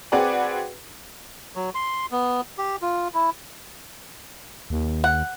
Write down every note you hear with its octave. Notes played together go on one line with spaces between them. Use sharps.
C4 F#4 G#4 B4 D5
F#3
C6
B3
G4
F4
E4
D#2
F#5